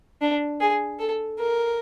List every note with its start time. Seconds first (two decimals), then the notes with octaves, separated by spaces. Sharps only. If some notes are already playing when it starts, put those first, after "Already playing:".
0.21 D4
0.60 G#4
0.99 A4
1.39 A#4